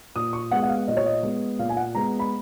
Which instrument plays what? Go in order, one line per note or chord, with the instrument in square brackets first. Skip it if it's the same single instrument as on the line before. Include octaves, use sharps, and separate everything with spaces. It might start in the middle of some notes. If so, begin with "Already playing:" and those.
[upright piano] A#2 D#6
C#6
G#3 B3 F#5
F#5
F5
A#2 D#5
C#5
D#5
G#3 B3
A#2 F5
G#5
F#5
G#3 B3 A#5
B5